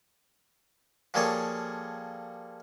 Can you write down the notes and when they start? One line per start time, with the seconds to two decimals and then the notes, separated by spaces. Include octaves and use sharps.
1.14 F3 G3 A#3 G#4 A4 C#5